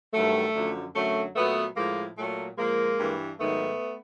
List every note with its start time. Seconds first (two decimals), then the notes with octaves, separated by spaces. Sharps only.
0.13 G2 D#3 F#3 A3
0.54 F#2 D3 F3
0.94 F#2 D3 F#3 A3
1.35 A#2 F#3 A3 B3
1.76 A2 F3 G#3 A#3
2.17 A#2 F#3 A3
2.58 A#2 F3 G#3 A#3
2.99 G2 E3
3.39 G#2 D#3 F#3 A3 B3